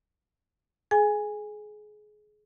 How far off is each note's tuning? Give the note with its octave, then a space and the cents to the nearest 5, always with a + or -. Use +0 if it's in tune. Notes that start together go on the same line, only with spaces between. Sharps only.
G#4 +25 G#5 -10